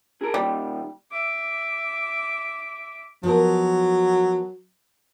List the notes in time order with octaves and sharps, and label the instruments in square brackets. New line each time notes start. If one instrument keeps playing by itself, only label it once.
[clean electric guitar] G#4 A#4
[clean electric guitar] A#2 D#3 [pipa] G3
[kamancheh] E5 D6
[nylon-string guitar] F3 B3 A#4 [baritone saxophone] F#3